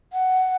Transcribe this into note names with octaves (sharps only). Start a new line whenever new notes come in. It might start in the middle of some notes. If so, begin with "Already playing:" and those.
F#5